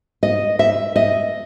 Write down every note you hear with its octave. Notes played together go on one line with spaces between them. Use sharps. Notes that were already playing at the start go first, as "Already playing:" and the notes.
D#5
E5
D#5